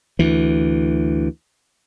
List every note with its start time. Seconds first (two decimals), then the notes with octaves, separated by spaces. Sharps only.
0.19 D2 E3